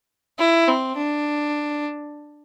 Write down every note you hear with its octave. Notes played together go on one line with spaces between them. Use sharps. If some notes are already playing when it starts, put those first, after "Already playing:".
E4
C4
D4